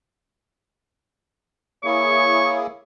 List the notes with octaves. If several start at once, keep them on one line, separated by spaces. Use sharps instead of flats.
A#3 E4 G#4 C#5 C#6